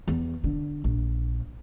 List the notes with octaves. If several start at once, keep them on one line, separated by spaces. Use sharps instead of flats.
E2
D3
A#1